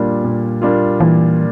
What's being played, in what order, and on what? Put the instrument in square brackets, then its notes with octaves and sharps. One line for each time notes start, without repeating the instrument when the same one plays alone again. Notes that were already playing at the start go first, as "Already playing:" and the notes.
Already playing: [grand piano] A#2 G3 A#3 D4 F4
A#2
G3 A#3 D4 F4
[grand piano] A#2 [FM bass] E3